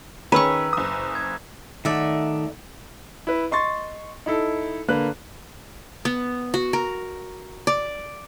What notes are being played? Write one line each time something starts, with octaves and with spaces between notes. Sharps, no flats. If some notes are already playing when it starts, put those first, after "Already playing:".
D#3 C#4 G#4 B4 A#5 B5 C#6 E6
F#1 D#6
G#6
D#3 A3 D5 E5 F#5
E4 B4
D#5 C6 C#6 A6
D#4 E4 A4
D3 A#3 B4 F#6
B3
F#4
A#4
D5